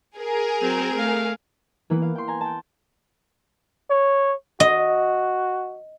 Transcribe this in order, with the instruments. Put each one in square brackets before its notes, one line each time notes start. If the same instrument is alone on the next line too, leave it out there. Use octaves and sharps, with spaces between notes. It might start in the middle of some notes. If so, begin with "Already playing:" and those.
[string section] G#4 A#4
[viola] F#3 C4
A3 F5
[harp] E3 A#3 B3 E4
F5
G5 C6
G#5 A#5
G5 A5
[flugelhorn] C#5
[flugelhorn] F#4 [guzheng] D#5